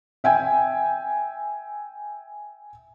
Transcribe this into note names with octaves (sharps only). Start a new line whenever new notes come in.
E5 G5 G#5